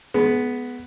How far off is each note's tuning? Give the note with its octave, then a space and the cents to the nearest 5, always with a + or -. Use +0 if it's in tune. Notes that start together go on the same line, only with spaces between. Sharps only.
G#3 +30 B3 +0